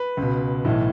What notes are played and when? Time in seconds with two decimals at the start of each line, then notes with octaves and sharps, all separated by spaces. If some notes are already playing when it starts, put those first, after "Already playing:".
Already playing: B4
0.17 C#2
0.22 B2
0.65 B1 A2 E3